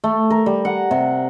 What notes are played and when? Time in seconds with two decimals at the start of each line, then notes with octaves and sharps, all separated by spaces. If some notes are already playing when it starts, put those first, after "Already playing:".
0.04 A3
0.30 A#4
0.46 G3
0.65 F#5
0.91 C3